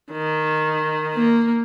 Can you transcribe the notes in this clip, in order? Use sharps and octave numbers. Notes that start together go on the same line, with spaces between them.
D#3
A#3